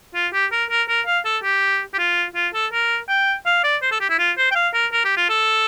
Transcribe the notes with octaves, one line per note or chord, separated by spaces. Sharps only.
F4
G4
A#4
A#4
A#4
F5
A4
G4
G4
F4
F4
A4
A#4
G5
F5
D5
C5
A4
G4
E4
F4
C5
G5
F5
A#4
A#4
G4
F4
A4